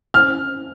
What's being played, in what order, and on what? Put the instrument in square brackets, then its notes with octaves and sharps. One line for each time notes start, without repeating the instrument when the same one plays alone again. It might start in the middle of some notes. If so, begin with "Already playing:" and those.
[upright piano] F6